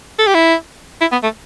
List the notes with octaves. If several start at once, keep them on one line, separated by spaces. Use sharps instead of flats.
A4
G4
E4
E4
B3
A3